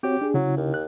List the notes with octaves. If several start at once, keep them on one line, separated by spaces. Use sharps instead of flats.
C4 F#4 G4 C#5
D4 G#4
C#3 F#3 E4
D#2
F#6